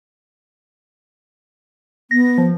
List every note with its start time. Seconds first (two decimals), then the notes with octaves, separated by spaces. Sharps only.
2.11 B3 A#6
2.38 F3